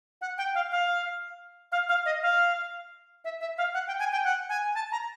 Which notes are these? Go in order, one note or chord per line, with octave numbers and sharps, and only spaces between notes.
F#5
G5
F5
F5
F5
F5
D#5
F5
E5
E5
F5
F#5
G5
G#5
G5
F#5
G#5
A5
A#5